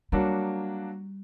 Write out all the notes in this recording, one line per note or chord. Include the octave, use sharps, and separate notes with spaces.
F#3 G3 A#3 D4 F#4